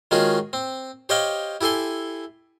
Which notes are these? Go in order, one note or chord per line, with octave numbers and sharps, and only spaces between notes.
D#3 G#3 C#4 F4 F#4 G#4
C4
G4 C5 C#5 D#5 F5 G5
E4 G4 A4 G#5 C6